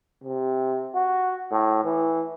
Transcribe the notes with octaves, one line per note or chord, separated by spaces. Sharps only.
C3
F#4
A2
E3